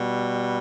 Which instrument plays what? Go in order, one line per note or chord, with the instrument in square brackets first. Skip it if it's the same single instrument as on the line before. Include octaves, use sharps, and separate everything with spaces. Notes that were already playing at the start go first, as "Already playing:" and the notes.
Already playing: [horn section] B2 G3